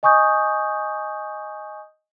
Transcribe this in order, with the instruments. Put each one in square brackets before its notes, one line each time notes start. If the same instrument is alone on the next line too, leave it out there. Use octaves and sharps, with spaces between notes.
[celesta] D#5 G#5 C#6 D#6 G6